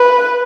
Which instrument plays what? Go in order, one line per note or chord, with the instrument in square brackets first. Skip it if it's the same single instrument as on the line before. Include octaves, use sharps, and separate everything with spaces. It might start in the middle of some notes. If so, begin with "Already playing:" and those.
Already playing: [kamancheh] B4